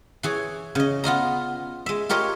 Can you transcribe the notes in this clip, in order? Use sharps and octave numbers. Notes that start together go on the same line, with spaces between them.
E3 G#4 C#5
C#3 D#5
B3 F4 D#5 A#5
G#3 E5
F4 G4 A#4 C#5 D#5